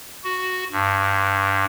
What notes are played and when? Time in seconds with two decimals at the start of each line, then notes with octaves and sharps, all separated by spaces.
0.24 F#4
0.72 G2